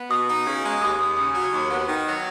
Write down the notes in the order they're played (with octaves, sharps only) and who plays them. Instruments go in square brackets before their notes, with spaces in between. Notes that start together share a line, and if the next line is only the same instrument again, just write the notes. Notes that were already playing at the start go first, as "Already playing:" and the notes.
Already playing: [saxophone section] B3
[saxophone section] B2 [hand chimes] D#6
[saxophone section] D#4
C#3
G#3
[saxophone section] D#2 [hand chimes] D#6
[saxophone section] D#2 [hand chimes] D#6
[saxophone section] C#3 [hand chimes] D#6
[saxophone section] F#3
D#2
B3
D#3
F#3